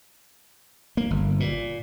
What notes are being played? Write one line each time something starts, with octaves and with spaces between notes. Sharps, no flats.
A#3
G1
A#2